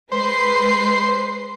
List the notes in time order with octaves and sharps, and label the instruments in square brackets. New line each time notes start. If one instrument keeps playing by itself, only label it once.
[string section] G#3 B4 C7 [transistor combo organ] C5